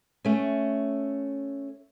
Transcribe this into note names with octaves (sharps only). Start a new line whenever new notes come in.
A3 C#4